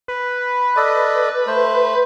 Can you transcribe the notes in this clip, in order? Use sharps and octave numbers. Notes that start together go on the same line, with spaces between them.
B4
A4 D5 D#5
A3 C5